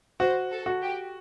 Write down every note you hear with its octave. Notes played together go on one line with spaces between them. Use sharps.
F#4 C5
A4
F#4
G4